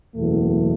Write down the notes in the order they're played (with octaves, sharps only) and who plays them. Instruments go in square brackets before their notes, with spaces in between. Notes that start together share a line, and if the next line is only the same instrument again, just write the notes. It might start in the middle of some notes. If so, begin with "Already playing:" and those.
[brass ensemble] F#1 E2 B2 A3